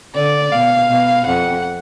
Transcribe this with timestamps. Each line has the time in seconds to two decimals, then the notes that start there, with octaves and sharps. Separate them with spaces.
0.15 D3 D5
0.52 B2 F5
0.89 B2
1.26 F2 F#5